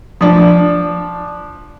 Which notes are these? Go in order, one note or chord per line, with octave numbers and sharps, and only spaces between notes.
F3 D4